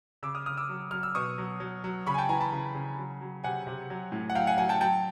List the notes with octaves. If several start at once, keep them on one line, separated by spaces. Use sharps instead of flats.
C#3 D6 E6
D#6 F6
C#3 D#6 F6
D6 E6
F#3
F#3 F6
E6
B2 C#6 D#6
F#3
F#3
F#3
C#3 B5 C#6
G#5
G5 A5
E3 G#5 A#5
A5 B5
C#3
C#3
F#3
F#3
C3 F#5 G#5
C3
F#3
A2
F#5
F#3 F5 G5
F#5 G#5
F#3 F#5 G#5
G5 A5
F#3 G5 A5